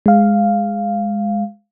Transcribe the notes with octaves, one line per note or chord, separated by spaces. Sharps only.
G#3 F5